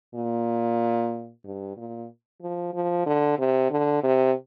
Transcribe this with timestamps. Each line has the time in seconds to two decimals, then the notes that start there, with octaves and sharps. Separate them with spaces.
0.15 A#2
1.45 G2
1.77 A#2
2.42 F3
2.74 F3
3.06 D3
3.39 C3
3.71 D3
4.03 C3